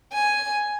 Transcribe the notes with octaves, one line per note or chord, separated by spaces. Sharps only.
G#5